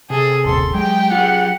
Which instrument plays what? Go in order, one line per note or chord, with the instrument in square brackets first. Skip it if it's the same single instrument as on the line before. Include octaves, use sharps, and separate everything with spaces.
[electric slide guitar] C3 [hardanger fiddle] G#4 A4
[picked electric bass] D#1 A1 [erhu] A4 [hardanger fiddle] C6
[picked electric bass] F#3 [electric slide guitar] G#3 [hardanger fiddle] G4 [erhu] G5
[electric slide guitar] F4 G#4 [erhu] F#5